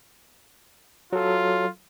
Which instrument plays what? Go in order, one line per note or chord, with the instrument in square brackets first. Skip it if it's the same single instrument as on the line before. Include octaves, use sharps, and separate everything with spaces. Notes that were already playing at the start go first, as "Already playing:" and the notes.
[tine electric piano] F#3 A4 [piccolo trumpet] F4